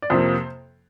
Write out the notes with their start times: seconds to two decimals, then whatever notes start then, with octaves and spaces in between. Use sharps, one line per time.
0.02 D5
0.10 F2 C3 F3 A#3 C5